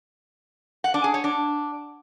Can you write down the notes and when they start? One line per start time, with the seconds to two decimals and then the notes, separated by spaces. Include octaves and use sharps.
0.84 F#5
0.94 D4
1.04 G#4
1.14 C#5
1.24 D4